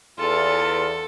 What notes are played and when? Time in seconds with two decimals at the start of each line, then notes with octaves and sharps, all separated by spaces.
0.19 E2 F4 A4